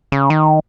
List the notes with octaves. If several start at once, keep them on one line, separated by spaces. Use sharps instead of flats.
C#3
D#3